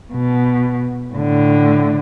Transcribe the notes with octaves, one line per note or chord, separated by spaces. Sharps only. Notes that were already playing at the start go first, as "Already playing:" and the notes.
B2
A2 D3